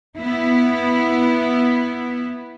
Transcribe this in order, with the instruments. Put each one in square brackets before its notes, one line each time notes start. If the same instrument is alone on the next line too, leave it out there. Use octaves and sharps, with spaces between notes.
[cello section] B3 E4